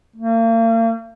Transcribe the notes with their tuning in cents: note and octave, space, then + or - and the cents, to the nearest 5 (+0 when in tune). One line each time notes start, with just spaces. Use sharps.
A#3 -40